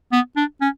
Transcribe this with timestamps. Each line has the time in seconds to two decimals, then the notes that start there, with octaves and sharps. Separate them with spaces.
0.12 B3
0.37 D4
0.61 C#4